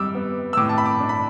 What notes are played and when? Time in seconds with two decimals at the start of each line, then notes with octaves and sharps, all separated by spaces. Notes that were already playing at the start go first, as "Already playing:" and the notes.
Already playing: G3 D6 E6
0.15 B3
0.53 E6
0.57 A2 D6
0.69 A5
0.78 B5
0.86 D6
1.00 D4
1.09 B5